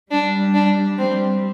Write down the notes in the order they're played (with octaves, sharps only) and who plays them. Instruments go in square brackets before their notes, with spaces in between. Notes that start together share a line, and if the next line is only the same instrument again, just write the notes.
[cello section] G3 [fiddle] D4
[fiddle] D4
[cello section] G3 [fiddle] C4